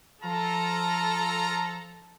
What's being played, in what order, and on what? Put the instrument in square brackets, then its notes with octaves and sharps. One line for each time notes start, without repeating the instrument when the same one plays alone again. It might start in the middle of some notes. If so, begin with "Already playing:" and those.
[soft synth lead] F3 [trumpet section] F4 A#5 [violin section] A4